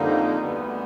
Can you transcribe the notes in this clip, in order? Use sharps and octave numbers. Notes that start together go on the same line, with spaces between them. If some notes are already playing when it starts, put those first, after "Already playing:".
Already playing: F2 D3 G3 A#3 D#4
D2 D3 G3 B3